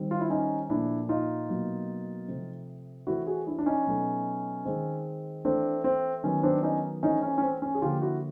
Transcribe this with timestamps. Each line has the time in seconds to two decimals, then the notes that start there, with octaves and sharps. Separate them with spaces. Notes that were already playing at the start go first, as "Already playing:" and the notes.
Already playing: D#3 G3 C4
0.11 F4
0.20 E4
0.30 C#4 D#4
0.70 A#2 F3 A3 D4 E4
1.09 D#4 F4
1.49 B2 F#3 A#3
2.28 C3 F3 A3 C4
3.07 E3 A3 C4 E4 F#4
3.26 F#4 G#4
3.47 D4 E4
3.59 D4
3.66 C#4 D#4
3.86 B2 F#3 A3
4.65 D#3 G#3 C4
5.44 E3 A3 C4 D4
5.84 C4
6.23 D#3 F#3 B3 C#4
6.43 C4 D4
6.63 C#4 D#4
7.03 E3 A3 C4 C#4 D#4
7.22 C#4
7.38 C#4
7.42 C4
7.62 C#4
7.75 G#4
7.82 D3 F3 A#3 F4 G4
8.02 E4 F#4